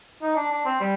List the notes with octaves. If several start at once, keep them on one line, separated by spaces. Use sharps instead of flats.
D#4
D4
D4
C4
G3